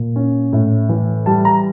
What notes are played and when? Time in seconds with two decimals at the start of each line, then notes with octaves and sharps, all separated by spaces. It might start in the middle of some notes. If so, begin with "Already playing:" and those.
Already playing: A#2
0.16 C#4
0.53 A2
0.89 E3
1.26 G3 A5
1.45 A#5